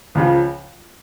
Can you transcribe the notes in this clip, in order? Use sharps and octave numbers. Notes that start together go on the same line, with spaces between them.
C#2 C#3 F3